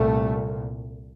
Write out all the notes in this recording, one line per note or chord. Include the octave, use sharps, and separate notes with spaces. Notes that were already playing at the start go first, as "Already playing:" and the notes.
Already playing: C2 A#2 A3